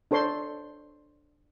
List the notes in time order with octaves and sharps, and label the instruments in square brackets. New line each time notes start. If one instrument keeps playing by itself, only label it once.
[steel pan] D4 A4 C5 C#5 C6